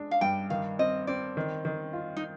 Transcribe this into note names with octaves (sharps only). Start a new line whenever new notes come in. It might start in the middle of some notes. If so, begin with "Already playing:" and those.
Already playing: G#3 D4
F5
G2 G5
D#3 F5
C4 D#5
C4 D5
D#3
D#3
F4
D#4